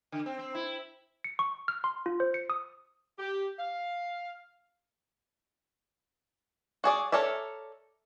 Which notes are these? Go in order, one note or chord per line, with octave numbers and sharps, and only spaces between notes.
D3
C4
C4
E4
C#7
C#6
F6
C6
F4
C5
C#7
D#6
G4
F5
F#4 G#4 D5
A4 A#4 C#5 D5 E5